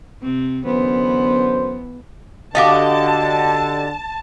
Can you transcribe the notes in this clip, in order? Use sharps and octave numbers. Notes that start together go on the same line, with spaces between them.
C3 C4
F#2 D3 E3 B3 C5
D3 D#4 F#4 G4 D#5 F5 A5 D6